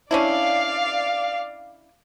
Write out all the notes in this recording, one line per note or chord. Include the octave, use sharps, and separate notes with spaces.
C#4 D4 E4 D5 F5